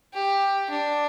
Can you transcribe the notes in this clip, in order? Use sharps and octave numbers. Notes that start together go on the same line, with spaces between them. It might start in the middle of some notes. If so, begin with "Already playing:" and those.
G4
D4